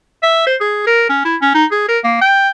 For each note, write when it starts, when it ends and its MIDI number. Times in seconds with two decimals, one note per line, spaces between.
0.23 0.42 76
0.47 0.56 72
0.61 0.86 68
0.87 1.08 70
1.09 1.21 61
1.25 1.36 64
1.42 1.51 61
1.54 1.65 63
1.71 1.88 68
1.88 1.99 70
2.04 2.16 58
2.21 2.49 79